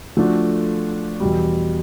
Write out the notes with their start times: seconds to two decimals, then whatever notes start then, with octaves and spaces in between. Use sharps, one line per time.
0.17 F3 A3 D4 F#4 A4
1.20 E2 B2 G3